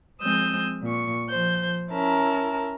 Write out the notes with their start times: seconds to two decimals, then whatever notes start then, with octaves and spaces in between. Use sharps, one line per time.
0.21 F3 G#3 C4 D#6 E6 G6
0.83 A#2 C#6
1.31 F3 C5 G6
1.90 C#4 E4 A#4 A5 A#5